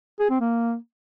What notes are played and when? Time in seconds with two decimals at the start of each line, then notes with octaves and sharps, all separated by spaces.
0.20 G#4
0.30 C4
0.40 A#3